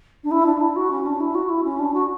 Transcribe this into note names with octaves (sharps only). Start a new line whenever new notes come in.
D4
E4
D4
E4
F#4
C#4
D4
E4
F#4
E4
C#4
D4
F#4